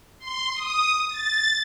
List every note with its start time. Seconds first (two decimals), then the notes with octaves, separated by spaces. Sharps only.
0.19 C6
0.54 D#6
1.09 A6